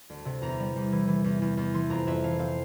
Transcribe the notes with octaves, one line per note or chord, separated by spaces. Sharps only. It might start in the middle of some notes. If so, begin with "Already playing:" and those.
D2
C3
E2 A#5
G3
E2
E3
E3
E2
E2
E2
E3 C6
F2 A#5
F2 E5
E3 F5
C4 F5